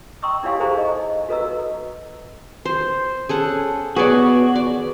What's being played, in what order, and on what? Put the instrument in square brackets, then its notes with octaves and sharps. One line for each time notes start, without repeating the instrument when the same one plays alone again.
[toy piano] G5 A#5 C6 C#6 D#6 E6
D4 E4 G4 C#5 F5 G#5
G#4 A4 C5 G#5 A#5 C#6
D#4 D#5
F#4 A4 B4 D#5 A#5 E6
[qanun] C5
[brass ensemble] C#4 [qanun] G#4 A4 F#5
[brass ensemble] B3 [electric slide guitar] F#4 [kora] G#4 C#5 [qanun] B4 D5
[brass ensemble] F2 D#3 [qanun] D5